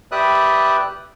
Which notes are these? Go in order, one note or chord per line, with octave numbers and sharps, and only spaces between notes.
G4 B4 D5 E5 D#6 F#6